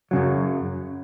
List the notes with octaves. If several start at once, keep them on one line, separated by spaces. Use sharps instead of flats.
F#2 C#3 F#3